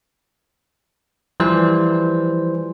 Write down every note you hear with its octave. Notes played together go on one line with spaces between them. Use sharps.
E3 F3 G3 C5